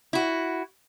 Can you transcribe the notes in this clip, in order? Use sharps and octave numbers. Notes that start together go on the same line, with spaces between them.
E4 F#4